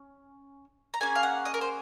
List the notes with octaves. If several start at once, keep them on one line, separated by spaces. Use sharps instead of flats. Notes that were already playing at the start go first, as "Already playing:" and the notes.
Already playing: C#4
A#5
A#3 C#4 G#4 G#5
F5
F#5
D#5
A#4
C5